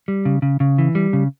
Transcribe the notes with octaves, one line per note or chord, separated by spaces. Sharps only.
G3
C#3
C#3
C#3
E3
G3
C#3